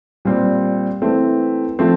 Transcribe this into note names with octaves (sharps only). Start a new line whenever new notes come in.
A#2 G3 C4
E3 A3 C4
F3 A3 C4